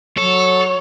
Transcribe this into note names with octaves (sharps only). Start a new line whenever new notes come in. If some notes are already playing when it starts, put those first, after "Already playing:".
F#3 A4 C#5